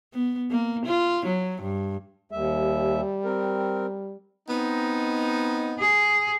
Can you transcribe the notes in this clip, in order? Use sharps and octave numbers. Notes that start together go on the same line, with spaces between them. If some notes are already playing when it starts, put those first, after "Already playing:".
B3
A#3
F4
F#3
G2
D#2 G3 E5
C4 A#4
B3 C4 D#4
G#4